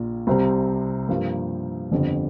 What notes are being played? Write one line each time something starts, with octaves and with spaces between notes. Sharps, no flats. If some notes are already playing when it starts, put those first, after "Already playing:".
Already playing: A#1 A#2 A#3 F4
C2 C3 G3 C4
G2 F3 A#3 G4
G1 F2 D3 G3